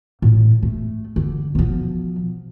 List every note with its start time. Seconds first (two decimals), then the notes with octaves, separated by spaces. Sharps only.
0.22 A2
0.63 A3
1.16 D3
1.55 B2 F3